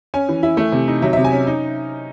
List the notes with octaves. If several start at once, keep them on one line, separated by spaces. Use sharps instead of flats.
C#4 G#5
E3
E4
A3
C3
D#4
F#3 E5
E5
C3
G#5
C#4
D#4